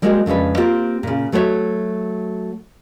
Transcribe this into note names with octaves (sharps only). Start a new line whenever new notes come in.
G3 G#3 A#3 C4 F#4 D#5
F2 C#3 G#3 D4 B4
A#3 C4 F4 G4
A#2 C#3
F#3 A3 F#4 C5 C#5 E5